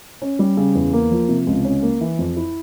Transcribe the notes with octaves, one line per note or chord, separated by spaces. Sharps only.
C#4
G3
C#3
E2
A#3
F3
C3
C#2
C#4
A#3
E3
F2
E4